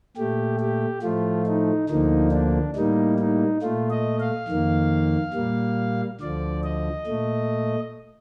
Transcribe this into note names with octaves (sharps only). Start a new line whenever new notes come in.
A#2 A3 G4
G4
A2 F3 A3 F4
D#4
D2 D3 F3 A#3 D#4
D4
A2 G3 A#3 D#4
D#4
A#2 A3 F4
D#5
F5
F2 D#3 A#3
A#2 G3 A#3
D2 D3 F3 D5
D#5
A#2 A3